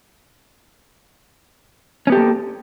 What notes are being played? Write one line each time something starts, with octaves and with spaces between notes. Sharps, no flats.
A#3 B3 C#4 G4 A4